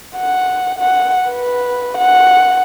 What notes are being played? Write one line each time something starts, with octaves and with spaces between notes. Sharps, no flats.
F#5
F#5
B4
F#5